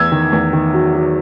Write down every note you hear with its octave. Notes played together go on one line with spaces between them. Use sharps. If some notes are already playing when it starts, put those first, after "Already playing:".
Already playing: E2 E6 G#6
D#3
E2
D#3
F#3
F#3